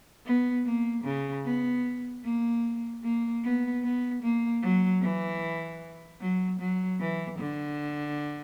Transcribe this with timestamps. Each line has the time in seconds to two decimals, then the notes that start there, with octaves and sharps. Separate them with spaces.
0.25 B3
0.66 A#3
1.05 C#3
1.45 B3
2.24 A#3
3.03 A#3
3.43 B3
3.83 B3
4.22 A#3
4.62 F#3
5.02 E3
6.20 F#3
6.60 F#3
7.00 E3
7.39 D3